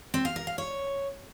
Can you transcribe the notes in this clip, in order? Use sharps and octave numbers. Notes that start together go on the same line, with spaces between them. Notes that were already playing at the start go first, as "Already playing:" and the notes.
C4
F5
A#4
F5
C#5